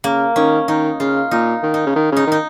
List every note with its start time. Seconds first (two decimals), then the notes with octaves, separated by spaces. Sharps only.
0.04 C#3 A#3
0.36 D#3 C#4
0.68 D#3 D#4
1.00 C#3 F4
1.31 A#2 D#4
1.63 D#3
1.74 D#4
1.86 C#3
1.95 D#3
2.12 C#3 D#4
2.27 D#3 D#4